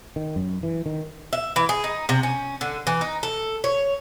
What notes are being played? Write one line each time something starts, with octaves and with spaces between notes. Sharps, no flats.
D#3
F#2
E3
D#3
E5
E3
G#4
D#4
C3
C#4
D3
E3
D#4
A4
C#5